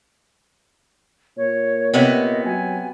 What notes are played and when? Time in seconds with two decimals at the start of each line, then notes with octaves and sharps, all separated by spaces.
1.37 A#2 C#5
1.94 C3 B3 C#5 D#5
2.45 F#3 G#5